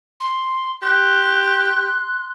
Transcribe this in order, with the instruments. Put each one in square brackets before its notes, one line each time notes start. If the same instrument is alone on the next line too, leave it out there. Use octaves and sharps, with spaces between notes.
[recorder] C6
[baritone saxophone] G4 [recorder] C6 [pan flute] F#6